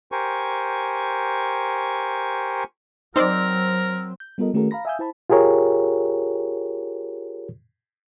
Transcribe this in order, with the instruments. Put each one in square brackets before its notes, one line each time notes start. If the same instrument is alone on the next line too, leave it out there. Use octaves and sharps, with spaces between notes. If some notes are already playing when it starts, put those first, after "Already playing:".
[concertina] G4 A#4 C5 G#5 C#6
[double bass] F#3 [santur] C4 [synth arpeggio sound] D#4 C5 D5 [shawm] A#4
[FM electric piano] G6
G3 B3 F4 A4 A#4 D#5
D#3 A3 C#4 F#4 G#4 A#4
F5 A#5 B5 A#6
E5 F5 G#5 D#6 E6 G6
E4 C5 A5 B5
[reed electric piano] F4 G4 G#4 A#4 C#5